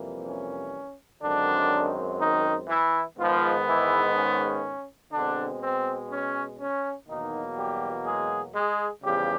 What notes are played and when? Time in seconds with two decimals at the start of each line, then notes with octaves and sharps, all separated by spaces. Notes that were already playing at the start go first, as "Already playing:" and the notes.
Already playing: F2 C3 E3 G3 A#3
0.25 C#4
1.22 F#2 D3 D#3 G#3 C4 D4
2.19 D#3 D#4
2.68 E3 E4
3.18 G#2 D#3 F3 G#3 B3 F4
3.66 E3 E4
4.16 C#4
5.12 B2 D3 G#3 C4 D4
5.62 C4
6.10 C#4
6.59 C#4
7.08 E2 B2 D#3 F#3 A#3 D#4
7.56 G3 G4
8.06 G#3 G#4
8.55 G#3 G#4
9.03 E2 C#3 F3 G3 G4